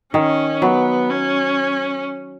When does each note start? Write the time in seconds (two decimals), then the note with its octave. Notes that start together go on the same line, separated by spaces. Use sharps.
0.14 D#3 C#4
0.62 F#3 B3
1.10 C#4